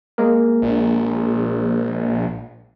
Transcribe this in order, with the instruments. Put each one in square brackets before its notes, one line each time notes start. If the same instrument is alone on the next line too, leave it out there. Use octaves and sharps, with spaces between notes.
[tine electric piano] G#3 A#3 A#4
[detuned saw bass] A#1